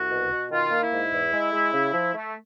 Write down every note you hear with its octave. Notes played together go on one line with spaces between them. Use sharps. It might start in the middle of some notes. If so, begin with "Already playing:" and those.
Already playing: C2 F#4
B2
B2
D#3 F4
A#3
E4
G#2
E2
G#3
G#3
C#3
F3
A3